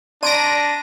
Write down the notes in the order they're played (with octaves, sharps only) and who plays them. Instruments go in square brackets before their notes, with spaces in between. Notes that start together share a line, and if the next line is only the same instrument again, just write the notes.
[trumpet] D4 [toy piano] D5 A#5 C6 [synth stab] A#6 D7 D#7